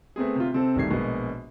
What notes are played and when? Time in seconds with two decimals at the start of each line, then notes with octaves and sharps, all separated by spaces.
0.16 A3 B3 C4 G#4
0.36 C3 F4
0.53 C3 C4 A4
0.76 E1 D#3 G3 A3 G#6 C7
0.90 A#1 B2 G#3 A#3